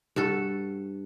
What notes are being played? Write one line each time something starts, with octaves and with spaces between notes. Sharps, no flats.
G2 F#4 A4